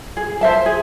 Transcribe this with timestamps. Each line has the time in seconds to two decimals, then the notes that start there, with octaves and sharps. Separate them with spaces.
0.17 G#4
0.41 C5 E5 A5
0.66 G#4